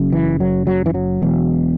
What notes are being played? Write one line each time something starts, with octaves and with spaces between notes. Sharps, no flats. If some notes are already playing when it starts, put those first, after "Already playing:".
Already playing: F#1 F#2 C#3
E3
F#3
F#3
E3
F#3
E1 E2 B2